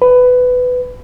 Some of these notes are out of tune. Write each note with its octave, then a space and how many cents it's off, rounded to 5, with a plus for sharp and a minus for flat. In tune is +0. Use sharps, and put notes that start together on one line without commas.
B4 +15